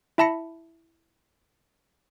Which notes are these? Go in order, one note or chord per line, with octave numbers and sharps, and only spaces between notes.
E4 E5 A5 B5 A#6 C#7